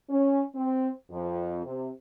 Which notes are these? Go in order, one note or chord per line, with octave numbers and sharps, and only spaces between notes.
C#4
C4
F2
C3